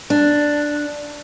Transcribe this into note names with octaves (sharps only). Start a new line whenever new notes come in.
D4